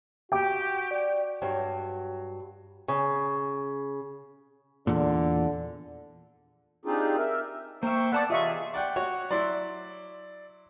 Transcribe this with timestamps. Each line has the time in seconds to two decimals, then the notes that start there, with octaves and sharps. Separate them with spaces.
0.32 F#4 G4 G5 D6
0.91 D5
1.42 G2 F#3
2.88 C#3
4.87 E2 A#2 D3
6.85 C4 D4 D#4 F4 G4 G#4
7.17 A#4 E5
7.83 A#3 C5 E5 G5 C#6
8.12 B3 A4 D5 F#5 A5 D6
8.30 C3 E3 F4 G#4 D#5 E5 C#6
8.74 D5 F#5 G5
8.96 F#4 C#5 F#5
9.31 F#3 E4 D5 C6